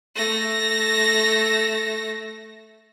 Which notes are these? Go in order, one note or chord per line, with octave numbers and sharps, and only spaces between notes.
A3 A#6